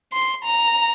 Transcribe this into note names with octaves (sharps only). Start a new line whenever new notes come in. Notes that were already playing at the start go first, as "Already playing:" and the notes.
C6
A#5